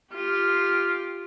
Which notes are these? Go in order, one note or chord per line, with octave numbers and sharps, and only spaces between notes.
F4 G4